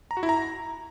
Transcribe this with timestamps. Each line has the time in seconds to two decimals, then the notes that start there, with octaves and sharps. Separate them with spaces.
0.11 A#5
0.17 F#4
0.23 E4
0.29 A#5